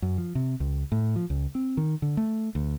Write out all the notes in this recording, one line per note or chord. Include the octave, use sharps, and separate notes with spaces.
F#2
F3
C3
C#2
A2
F3
C#2
C4
D#3
D3
A3
D2